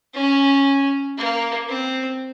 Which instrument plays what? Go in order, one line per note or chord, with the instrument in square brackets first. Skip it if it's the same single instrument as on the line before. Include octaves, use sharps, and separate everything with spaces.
[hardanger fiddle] C#4
A#3
C4